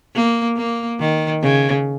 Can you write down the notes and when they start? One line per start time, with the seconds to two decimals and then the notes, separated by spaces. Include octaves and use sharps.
0.15 A#3
0.56 A#3
0.99 D#3
1.42 C#3